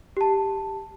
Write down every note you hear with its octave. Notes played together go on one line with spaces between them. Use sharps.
G4 A5